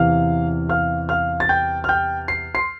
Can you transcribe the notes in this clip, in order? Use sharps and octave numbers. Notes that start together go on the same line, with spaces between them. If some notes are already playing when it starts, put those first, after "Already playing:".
Already playing: E2 C3 E3 F5 F6
F5 F6
F5 F6
A6
G5 G6
F6
G5 G6
C7
C6 C7